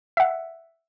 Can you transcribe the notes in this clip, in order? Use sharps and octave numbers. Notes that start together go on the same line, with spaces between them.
E5 F#5